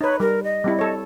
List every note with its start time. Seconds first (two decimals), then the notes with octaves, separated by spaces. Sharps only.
0.01 D#4 B4 C#5
0.20 G3 A#4
0.44 D#5
0.64 G3 C4 E4
0.79 A4 C#5